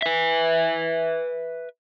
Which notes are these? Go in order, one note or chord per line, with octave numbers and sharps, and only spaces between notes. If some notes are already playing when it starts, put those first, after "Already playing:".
B4 E5